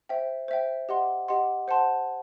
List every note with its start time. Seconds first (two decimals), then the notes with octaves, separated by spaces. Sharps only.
0.09 C5 E5 G5
0.48 C5 E5 G5
0.89 G4 D#5 F#5 C6
1.28 G4 D#5 F#5 C6
1.68 C5 F#5 A5 C6